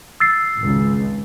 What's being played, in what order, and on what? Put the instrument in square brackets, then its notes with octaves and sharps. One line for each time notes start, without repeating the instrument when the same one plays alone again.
[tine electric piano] E6 A6 C7
[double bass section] G#1 C#2